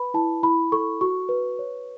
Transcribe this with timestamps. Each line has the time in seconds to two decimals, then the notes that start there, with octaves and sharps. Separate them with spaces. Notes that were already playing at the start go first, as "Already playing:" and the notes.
Already playing: B4 B5
0.14 E4 A5
0.43 E4 B5
0.72 A4 C#6
1.01 F#4 C#6
1.29 B4
1.59 C#5